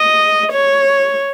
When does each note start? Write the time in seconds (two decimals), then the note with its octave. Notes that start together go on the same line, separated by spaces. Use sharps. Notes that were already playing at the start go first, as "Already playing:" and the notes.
Already playing: D#5
0.52 C#5